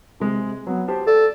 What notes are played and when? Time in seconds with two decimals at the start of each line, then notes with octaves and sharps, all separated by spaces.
0.20 C3 G#3
0.67 F#3 B3
0.88 G4 C5 A5
1.07 A4 D5